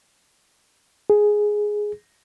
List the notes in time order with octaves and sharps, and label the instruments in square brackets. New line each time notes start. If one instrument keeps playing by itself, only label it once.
[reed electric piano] G#4